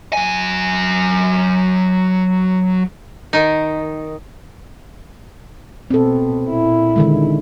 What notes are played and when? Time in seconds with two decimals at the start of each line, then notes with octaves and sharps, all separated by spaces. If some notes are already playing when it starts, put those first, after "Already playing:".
0.13 F#3 G#5
3.33 D#3 D#4
5.90 B2 C4 A4
6.45 A#2 E4
6.96 D3 D#3 G#3